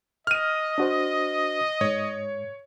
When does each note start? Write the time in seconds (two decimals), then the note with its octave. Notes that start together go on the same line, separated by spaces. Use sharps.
0.27 D#5 F6 D#7
0.78 D4 F#4 C5
1.81 G#2 C#5